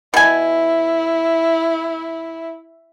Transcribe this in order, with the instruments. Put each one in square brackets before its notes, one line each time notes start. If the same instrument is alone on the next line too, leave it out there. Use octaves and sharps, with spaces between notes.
[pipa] B2 G#5 [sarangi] E4